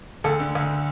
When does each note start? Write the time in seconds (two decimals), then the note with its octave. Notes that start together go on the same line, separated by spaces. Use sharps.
0.24 D2 A4
0.40 D3
0.55 D2